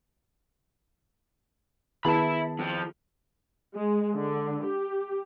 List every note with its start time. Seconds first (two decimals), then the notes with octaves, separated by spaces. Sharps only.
2.05 D#3 B3 E4 G#4 E5 A5 B5
2.59 F2 F3
3.75 G#3
4.15 D3
4.65 G4